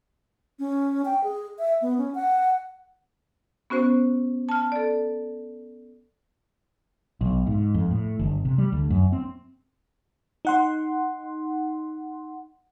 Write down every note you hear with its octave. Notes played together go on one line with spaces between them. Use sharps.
C#4
G5
G#4
E5
B3
C#4
F#5
B3 C#4 F#4 C5
A5 F6
A4 D5
B1
G#2
F2
A2
G1
C3
G3
D2
F#2
C4
D#4 F#5 C6